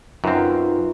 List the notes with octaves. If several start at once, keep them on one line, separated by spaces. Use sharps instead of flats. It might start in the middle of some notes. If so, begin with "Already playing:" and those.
F#2 C4 D#4 F4 B4